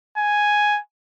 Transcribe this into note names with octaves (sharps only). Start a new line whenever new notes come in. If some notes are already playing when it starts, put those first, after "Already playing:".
G#5